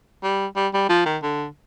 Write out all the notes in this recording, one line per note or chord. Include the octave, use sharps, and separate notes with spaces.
G3
G3
G3
F3
D#3
D3